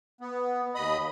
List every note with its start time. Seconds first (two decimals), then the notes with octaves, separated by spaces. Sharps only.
0.21 B3
0.75 D#2 D#5 B5 D#6